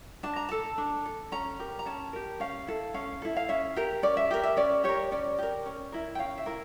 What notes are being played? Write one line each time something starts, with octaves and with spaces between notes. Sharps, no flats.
D4 A5
A#5
A4 A5
D4
A4
C#4 A#5
G4 A#4
A#5
C#4 A5
G4 A#4
C#4 F5
E4 A4
C#4 F5
E4 A4
F5
C#4 E5
G4 A#4
C#4 D5
E5
G4 A#4
E5
C#4 D5
G4 A#4 C#5
C#4 D5
G4 A#4
C#4
E4 A#4
G5
C#4 F5
E5
E4 A#4